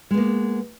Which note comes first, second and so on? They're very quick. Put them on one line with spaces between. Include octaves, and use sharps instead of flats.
G#3 B3 A#3